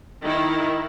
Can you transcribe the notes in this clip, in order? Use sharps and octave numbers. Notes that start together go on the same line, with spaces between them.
D#3 E4